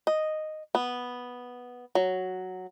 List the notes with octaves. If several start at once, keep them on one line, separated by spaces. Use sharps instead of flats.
D#5
B3
F#3